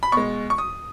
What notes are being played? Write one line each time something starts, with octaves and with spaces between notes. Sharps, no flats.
B5
B2 G#3 C#6
C#6
D#6